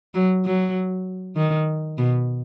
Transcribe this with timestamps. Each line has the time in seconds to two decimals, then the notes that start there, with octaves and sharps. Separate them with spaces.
0.14 F#3
0.45 F#3
1.36 D#3
1.98 B2